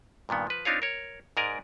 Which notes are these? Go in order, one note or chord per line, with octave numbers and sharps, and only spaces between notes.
G2 A#2 D#3 B3
F3 B4
C4 D4 D#4 F4 C#5 F5
A#4 C#5
G#2 G#3 A#4 D5 G#5 A#5